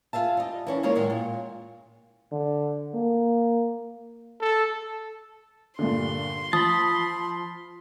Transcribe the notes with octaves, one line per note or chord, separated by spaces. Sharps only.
F4 G#4 E5 A5
G3 D#5
E3 C#4 D4
G#3 A#3 D4 F4 G#4 C#5
A2 D#3 F#3 G#3
A#2
D3
A#3
A4
G2 A#2 D3 C6
F3 A5 B5 D#6